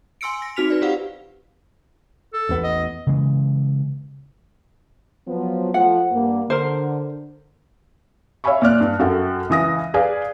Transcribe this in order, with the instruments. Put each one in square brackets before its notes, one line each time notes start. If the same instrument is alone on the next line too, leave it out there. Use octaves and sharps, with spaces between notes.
[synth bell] G#5 C6 E6 C#7 D7
A#6
C4 D#4 F#4 F6 B6 F7
B4 D5
F4 G4 C5 F5 F#5
[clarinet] A4
[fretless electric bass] A1 E2 B3
[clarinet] D#5
[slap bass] C#3 E3 G#3
[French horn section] F3 F#3 B3
[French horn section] F3 A3 [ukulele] F#5
[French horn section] G2 A#3
[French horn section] D3 [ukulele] A#4 C5
[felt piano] C#5 E5 F5 G#5 B5 C#6
A#2 D5 F6 F#6
G2
F#2 F#4 A4 F#5 G5
C#2 E3 D#6 A#6
G#4 B4 D5 F5 G#5